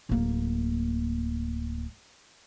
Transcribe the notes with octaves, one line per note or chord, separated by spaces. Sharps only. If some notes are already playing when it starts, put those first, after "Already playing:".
D1 A#3